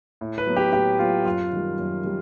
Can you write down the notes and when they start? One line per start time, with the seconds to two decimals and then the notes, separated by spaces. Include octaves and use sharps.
0.21 A2
0.38 B4
0.47 F#3 B3
0.56 G4
0.73 A2 G4
0.99 F#3 B3 F4
1.25 F#2 F4
1.53 D#3 G3
1.78 F#2
2.04 D#3 G3